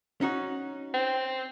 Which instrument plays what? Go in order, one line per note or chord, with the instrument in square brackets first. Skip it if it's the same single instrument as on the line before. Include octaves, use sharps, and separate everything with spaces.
[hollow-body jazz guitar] C#4 D#4 F#4
[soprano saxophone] C4